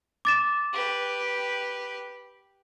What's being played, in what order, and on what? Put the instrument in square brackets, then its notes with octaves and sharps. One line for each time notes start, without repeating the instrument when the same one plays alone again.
[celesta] D6 A6 E7
[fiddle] G4 B4